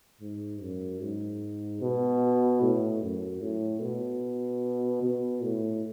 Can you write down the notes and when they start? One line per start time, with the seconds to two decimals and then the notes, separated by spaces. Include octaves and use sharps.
0.21 G#2
0.61 F#2
1.02 G#2
1.81 B2
2.62 A2
3.03 F#2
3.42 A2
3.82 B2
5.03 B2
5.43 A2